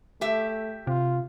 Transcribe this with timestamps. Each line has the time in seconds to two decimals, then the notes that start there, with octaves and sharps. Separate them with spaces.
0.21 A3 G4 E5
0.87 C3 F4